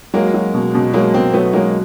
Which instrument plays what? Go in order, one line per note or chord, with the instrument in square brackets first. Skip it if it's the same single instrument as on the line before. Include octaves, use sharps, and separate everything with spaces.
[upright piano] F#3 [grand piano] G#3 A#3
[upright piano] F#3
B2
B2
[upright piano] F#3 [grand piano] G#3 A#3
[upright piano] B2 [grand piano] A#3 C4
[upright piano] F#3 [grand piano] A3 B3
[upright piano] F#3 [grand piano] G#3 A#3